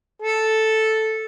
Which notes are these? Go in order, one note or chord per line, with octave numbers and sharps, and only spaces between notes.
A4